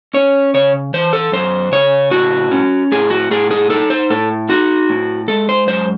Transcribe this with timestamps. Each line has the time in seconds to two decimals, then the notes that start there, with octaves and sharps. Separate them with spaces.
0.14 C#4 C#5
0.54 C#3 C#5
0.94 E3 C5
1.13 A4
1.32 F#2 C5
1.72 C#3 C#5
2.11 A2 F#4
2.51 C#4
2.92 A2 G#4
3.10 F#4
3.31 A2 G#4
3.51 G#4
3.70 D#4 A4
3.90 C5
4.10 A2 A4
4.49 D#4 F#4
4.89 A2
5.28 G#3 A4
5.49 C5
5.67 F#2 C5